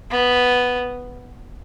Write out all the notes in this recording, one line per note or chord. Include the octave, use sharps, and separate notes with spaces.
B3